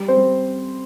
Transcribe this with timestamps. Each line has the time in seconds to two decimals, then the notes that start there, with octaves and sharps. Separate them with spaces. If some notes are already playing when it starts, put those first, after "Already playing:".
Already playing: G3
0.08 C4 C5
0.17 G3